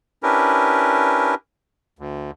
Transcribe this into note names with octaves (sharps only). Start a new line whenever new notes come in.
C#4 D4 E4 G4 A#4 B4
D2